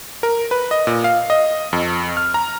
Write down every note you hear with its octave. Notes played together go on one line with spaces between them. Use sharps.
A#4
B4
D#5
A#2
F5
D#5
F2
F6
A#5